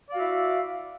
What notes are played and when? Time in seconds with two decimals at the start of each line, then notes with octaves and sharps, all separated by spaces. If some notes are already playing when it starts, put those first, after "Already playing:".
0.09 D5
0.12 F5
0.15 F#4
0.18 E5
0.20 E4